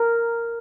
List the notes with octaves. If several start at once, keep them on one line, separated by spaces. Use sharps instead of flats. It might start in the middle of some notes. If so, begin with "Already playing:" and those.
Already playing: A#4